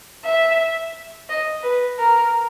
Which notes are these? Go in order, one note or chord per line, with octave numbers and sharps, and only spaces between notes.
E5
D#5
B4
A#4